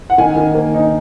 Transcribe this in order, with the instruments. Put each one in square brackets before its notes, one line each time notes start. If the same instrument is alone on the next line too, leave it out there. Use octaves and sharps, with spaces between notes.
[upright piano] F#5
D#3 G#5
D#3
A#3
D#4